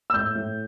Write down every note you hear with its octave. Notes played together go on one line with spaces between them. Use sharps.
E6
A2 G6
A2